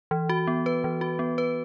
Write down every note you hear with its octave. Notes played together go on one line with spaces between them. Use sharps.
E3
F#4
B3
B4
E3
F#4
B3
B4